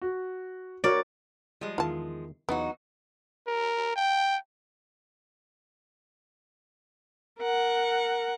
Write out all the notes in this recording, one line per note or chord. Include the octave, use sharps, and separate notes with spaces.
F#4
F#4 A#4 C#5 D5
F3 G3 G#3
E2 D#3 F4 E5 A5
E2 F#3 B3 D#4 F4 F#4 A#5
A#4
G5
A#4 F#5